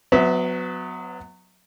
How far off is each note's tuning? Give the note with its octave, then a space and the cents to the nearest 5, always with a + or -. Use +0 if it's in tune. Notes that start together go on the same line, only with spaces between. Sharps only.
F#3 -15 B3 +25 E5 -20